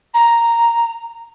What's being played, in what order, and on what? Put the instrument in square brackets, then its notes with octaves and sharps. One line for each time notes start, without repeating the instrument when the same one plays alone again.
[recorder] A#5